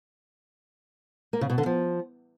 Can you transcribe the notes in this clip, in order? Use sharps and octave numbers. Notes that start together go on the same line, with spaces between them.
A#3
C#3
B2
D3
F3